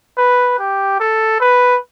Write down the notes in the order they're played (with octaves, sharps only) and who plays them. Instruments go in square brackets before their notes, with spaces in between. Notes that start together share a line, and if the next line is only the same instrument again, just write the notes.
[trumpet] B4
G4
A4
B4